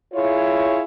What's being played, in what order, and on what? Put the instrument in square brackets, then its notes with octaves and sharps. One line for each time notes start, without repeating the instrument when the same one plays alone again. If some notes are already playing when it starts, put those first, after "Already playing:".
[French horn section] E4 F4 G#4 C#5